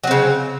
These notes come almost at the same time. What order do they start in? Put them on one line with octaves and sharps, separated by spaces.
F#3 C4 C#3